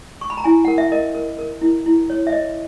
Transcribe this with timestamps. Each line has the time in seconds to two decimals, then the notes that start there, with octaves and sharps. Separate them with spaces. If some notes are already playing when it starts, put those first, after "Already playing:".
0.21 C#6
0.30 B5
0.37 A#5
0.44 E4 G#5
0.65 A#4 F#5
0.78 E5
0.92 A#4 D#5
1.15 A#4
1.39 A#4
1.62 E4
1.86 E4
2.10 C#5
2.27 E5
2.32 C#5 D#5